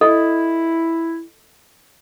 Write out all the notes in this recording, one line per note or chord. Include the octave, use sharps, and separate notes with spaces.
E4 A4 D#5